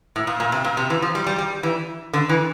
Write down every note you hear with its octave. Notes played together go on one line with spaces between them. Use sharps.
A2
A#2
A#2
C3
A#2
C3
E3
F3
G3
G3
G3
E3
D3
E3